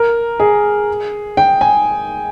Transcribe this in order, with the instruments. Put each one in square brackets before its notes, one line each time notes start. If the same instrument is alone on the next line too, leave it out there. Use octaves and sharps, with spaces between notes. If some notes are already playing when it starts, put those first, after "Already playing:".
Already playing: [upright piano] A#4
G#4
G5
G#5